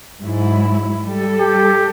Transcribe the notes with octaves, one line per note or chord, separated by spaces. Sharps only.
G#2 F#3 E4
G3 A4
G4